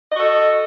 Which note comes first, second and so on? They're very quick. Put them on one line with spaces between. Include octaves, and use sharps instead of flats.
D#5 F#4 A4